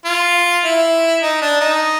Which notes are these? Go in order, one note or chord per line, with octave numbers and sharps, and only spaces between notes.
F4
E4
D#4
D4
D#4